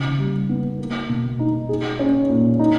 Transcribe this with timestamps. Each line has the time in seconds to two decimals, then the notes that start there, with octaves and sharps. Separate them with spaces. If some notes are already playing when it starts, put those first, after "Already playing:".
Already playing: C#3
0.18 G3
0.49 B3
0.79 A#3
1.09 B2
1.39 D#4
1.69 G#4
1.99 C#4
2.29 A#2
2.59 D#4